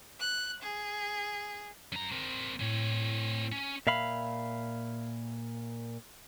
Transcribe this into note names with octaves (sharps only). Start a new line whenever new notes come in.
F#6
G#4
F#2 A#5
C4 A#4
A2 C4 C#5
C#4
A#2 E5 F5 B5